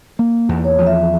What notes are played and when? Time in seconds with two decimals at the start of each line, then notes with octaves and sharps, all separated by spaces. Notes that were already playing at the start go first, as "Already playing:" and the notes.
0.19 A#3
0.49 E2
0.64 C#5
0.78 F3
0.87 E5